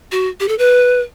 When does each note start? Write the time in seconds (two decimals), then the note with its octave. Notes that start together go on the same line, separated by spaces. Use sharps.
0.12 F#4
0.40 G4
0.48 A4
0.59 B4